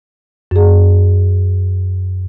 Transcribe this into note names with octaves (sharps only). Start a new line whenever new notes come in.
F#2 G#4